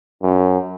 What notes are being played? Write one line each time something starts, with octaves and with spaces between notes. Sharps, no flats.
F#2